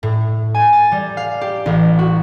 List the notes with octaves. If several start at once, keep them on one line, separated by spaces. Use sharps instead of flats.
A2
G#5
A6
G3
F5
G4
A1
F#4